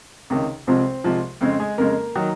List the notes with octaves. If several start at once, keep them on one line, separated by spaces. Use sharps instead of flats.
C#2 C3 D#3
C2 C3 F3 G#3 C4 C5
C2 C3 F3 G#3
F2 C#3 G#3 C4 C5
G#3 G#4
F2 C#3 G#3 A#3 A#4
D#3 F#3